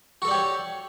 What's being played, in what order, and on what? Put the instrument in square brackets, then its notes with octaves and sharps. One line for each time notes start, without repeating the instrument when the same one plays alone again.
[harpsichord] F#4
A4
D4
G4
C#5